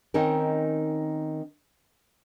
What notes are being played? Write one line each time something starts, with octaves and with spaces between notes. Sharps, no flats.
D#3 C4 C#4 D#4 A#4